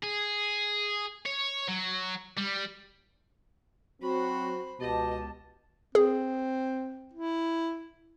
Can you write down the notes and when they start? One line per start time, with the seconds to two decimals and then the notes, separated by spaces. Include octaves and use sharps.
0.03 G#4
1.26 C#5
1.68 F#3
2.37 G3
4.02 F#3 C4 F#4 C5 B5
4.80 C#2 B2 G4 D#5 A5
5.95 C4 G#4
7.14 E4